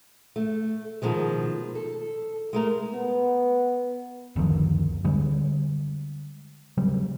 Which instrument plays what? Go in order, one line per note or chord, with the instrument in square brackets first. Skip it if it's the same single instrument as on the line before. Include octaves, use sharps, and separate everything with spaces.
[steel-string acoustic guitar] A3
B2 D#3 F3 G#3
A4
G#3 A3 A#4
[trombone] B3
[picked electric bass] F#1 D2 D#3 F3
D3 G3 G#3
C#3 F#3 G3